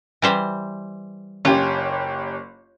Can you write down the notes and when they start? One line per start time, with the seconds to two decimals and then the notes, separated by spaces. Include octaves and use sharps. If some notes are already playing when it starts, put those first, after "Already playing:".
0.22 E3 G3 C5
1.45 F#1 C#4 F4 G4